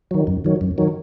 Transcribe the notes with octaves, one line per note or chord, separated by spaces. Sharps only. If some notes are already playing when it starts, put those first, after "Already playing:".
D#3 F#3
F#2
D#3 F#3
F#2
D#3 F#3